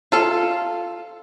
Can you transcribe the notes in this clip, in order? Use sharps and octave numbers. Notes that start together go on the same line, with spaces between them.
F4 A4 F5